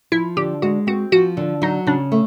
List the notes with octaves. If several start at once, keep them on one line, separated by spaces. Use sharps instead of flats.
F3 E4
D3 G4
G#3 F#4
C4 F#4
F3 F#4
D3
F#3 D#4
C#3 D4
A3